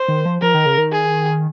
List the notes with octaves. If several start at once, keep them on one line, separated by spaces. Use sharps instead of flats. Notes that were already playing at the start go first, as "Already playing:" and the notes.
Already playing: C5
D#3
F3
F3 A#4
D#3
C#3
D#3
G#4